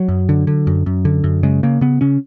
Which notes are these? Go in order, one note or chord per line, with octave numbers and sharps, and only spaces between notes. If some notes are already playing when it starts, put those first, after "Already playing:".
Already playing: F#3
F#2
D3
D3
F#2
F#2
D3
F#2
C#3 G#3
C#3 A#3
C#3 B3
C#3 C#4